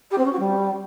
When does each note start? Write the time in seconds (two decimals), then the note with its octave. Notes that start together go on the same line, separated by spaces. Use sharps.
0.10 G4
0.17 C4
0.25 C#4
0.32 F#4
0.39 G3